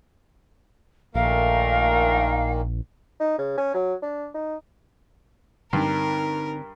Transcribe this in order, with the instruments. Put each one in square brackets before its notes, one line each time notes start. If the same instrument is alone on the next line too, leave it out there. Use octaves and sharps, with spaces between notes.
[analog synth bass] A#1 [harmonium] A#2 D#3 A#3 [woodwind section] A3 A#4 [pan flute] F5
[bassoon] D#4
C#3
C#4
F#3
D4
D#4
[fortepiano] G2 [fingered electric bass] D3 C4 [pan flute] D#4 [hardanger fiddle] A#4